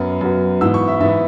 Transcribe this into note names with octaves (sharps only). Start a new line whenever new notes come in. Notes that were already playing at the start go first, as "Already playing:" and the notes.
Already playing: F#2 F#3 B3
F#2 F#3 B3
G#2 E3 B3 E6
C#6
E5
G#2 E3 B3 E5